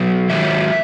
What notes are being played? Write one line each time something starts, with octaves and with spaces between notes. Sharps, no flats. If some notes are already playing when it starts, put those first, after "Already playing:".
Already playing: B2 F#3
G#2 D#3 F#3 E5